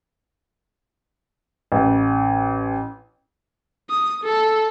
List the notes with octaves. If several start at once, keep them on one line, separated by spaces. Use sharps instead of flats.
A1
D#6
A4